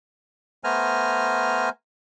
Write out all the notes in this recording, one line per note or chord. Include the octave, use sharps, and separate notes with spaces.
A3 B3 C5 G#5 A#5 F6